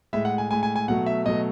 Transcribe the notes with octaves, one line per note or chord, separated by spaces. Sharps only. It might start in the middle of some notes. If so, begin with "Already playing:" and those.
A2 G#3 E5
F#5
G#5
A2 G#3 G#5
G#5
G#5
B2 F#3 A3 F#5
E5
B2 F#3 A3 D#5